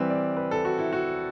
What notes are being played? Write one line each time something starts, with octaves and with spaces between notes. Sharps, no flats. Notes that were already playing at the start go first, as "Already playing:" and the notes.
Already playing: E3 G3 C4 B4
D5
B4
A4
F#4
E4
F#4